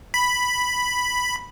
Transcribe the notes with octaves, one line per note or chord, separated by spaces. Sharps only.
B5